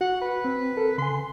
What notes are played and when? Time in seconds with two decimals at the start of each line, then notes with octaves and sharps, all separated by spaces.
0.01 F#4 F#5
0.21 B4
0.45 C4
0.77 A4 A#4
0.98 C#3 G#5 C6